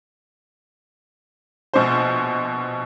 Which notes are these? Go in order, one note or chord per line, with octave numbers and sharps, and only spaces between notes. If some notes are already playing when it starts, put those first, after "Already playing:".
A#1 B2 C5